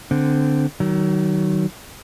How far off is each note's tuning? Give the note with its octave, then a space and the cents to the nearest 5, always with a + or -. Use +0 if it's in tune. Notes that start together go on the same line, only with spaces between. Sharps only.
D3 +0 C4 -20
D#3 -5 F#3 +25